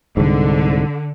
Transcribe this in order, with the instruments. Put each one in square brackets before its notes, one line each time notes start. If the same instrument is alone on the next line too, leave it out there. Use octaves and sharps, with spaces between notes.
[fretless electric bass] C2 G#2 [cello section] D3